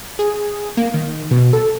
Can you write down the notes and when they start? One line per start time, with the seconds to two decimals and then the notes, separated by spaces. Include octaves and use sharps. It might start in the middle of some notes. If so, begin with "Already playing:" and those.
0.19 G#4
0.77 A#3
0.94 D#3
1.31 B2
1.53 A4